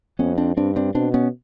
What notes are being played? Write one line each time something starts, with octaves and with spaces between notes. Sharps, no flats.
F2 B3 C#4
C4 D4
G2 C4 D4
C4 D4
B2 C4 D4
B3 C#4